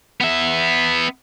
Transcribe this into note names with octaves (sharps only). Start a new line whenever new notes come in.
B3 E5